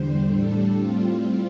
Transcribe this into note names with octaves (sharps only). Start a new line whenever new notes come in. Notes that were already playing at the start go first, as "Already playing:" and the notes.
Already playing: E2 D3 G3 C5
A2 G3 D4 A4
A2 G3 C4 F4